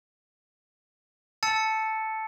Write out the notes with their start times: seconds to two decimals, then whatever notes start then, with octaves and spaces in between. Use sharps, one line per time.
1.43 A5 E6 A6 C#7